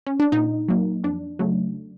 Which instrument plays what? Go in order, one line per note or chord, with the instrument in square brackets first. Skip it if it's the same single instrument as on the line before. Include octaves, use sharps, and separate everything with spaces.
[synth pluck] C#4
D4
A#2 D#4
F#3 A#3
F2 D4
C#3 F#3 A3